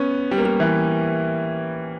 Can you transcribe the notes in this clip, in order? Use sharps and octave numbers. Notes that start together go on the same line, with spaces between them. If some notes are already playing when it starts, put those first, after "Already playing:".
Already playing: B3 C#4
G3
A#3
G3
E3